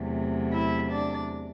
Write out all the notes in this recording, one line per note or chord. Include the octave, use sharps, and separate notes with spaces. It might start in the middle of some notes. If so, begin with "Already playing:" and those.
Already playing: E2 C3 F#3 A3
E4 E5
D4 D5